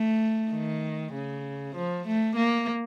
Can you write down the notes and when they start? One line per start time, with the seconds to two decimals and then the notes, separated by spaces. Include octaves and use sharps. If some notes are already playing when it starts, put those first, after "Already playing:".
Already playing: A3
0.51 D#3
1.13 C#3
1.76 F3
2.07 A3
2.36 A#3